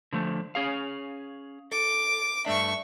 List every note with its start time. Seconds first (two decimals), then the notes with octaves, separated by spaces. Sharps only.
0.13 D3 F3 A3
0.55 C#4 G#4 F5
1.72 A4 D6
2.46 G2 A3 D4 E5 C#6